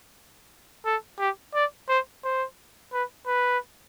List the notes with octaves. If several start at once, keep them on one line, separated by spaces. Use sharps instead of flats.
A4
G4
D5
C5
C5
B4
B4